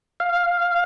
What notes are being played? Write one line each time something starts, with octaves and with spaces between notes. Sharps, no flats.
F5